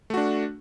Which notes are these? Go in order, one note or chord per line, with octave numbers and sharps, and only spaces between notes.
A3 D4 F#4